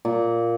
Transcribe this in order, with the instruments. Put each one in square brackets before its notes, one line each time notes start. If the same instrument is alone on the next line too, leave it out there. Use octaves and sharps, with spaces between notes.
[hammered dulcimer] A#2